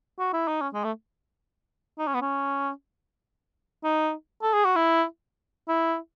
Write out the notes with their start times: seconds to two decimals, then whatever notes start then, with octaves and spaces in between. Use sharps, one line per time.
0.19 F#4
0.33 E4
0.48 D#4
0.61 C#4
0.74 G#3
0.85 A3
1.99 D#4
2.07 C#4
2.14 B3
2.22 C#4
3.84 D#4
4.43 A4
4.53 G#4
4.65 F#4
4.76 E4
5.68 E4